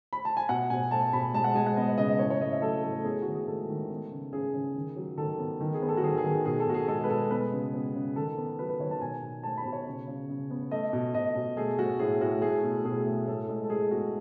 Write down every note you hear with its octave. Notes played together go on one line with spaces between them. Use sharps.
B5
A5
G#5
B2 F#5
B2 G#5
A3 A5
B2 B5
G#3 A5
F#5
G#3 G#5
F#5
B3 D#5
C#3 D#5
A2 C#5
C#5
A2 D#5
E5
F#3 A4
A2 A4
B3 G#4
D#3 F#4
G#4
G#3 A4
D#3
B3
C#3
C#3 G#4
C#3
D#3
F#3
D#3 A4
B3
D#3
G#4
B3
A4
F#4
D#3 G#4
G#4
D#3
B2 G#4
A4
B2 F#4
G#4
G#3 A4
B4
B2 A4
B3 B4
C#3
B3
C#3
D#3 A4
B3
F#3 B4
B4
D#3 C#5
A5
B2 G#5
B2
A3 A5
B5
B2
C#5
C#3
C#3
C#3
B3
A3 D#5
B2
B2 D#5
B2
A3 G#4
A3 F#4
A2 G#4
A2 F#4
A3 G#4
B2
B2 G#4
A3
A2 A4
G#3
A4
G#3 G#4
B3 F#4